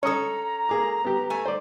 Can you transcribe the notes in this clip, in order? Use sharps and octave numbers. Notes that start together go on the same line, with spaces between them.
C#4 A4 C#5 D#5 A#5 D#6
A#3 G#4 D6
B3 G4
A3 G#5
C5 D5